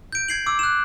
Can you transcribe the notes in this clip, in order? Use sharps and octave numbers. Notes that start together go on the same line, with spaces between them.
G6 D7
G#6 C7 F#7
D6 E6
F#6 E7